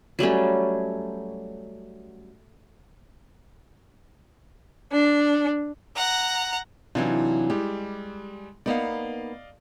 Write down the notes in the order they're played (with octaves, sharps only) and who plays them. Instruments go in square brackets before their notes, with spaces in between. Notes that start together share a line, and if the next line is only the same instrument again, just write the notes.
[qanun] F#3 G3 A3 C#4
[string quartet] D4
[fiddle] F#5 A#5
[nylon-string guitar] C3 E3 F#3 [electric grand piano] D4 D#4 F4
[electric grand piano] G3 G#3 [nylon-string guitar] G4
[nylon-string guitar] A#3 B3 D#4 [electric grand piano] D5 D#5 F5